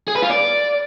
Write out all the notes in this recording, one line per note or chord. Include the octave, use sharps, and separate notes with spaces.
G#4
B4
F4
D5